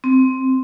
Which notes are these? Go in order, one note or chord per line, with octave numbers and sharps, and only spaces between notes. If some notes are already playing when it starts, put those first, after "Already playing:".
C4